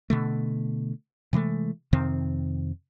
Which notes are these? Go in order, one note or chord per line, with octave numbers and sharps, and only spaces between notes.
B2 D3 A3
C3 E3 G#3 A3
F2 C3 D#3 C4